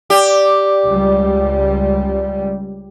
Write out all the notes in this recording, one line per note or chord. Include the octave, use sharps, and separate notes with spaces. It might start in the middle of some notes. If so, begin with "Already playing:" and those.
G4 D5
C#2 G3